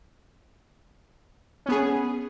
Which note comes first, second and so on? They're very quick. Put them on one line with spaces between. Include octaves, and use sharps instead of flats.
C#4 B3 G#4